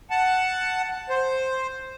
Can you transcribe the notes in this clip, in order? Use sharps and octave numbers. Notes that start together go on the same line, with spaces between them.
F#5 A5
C5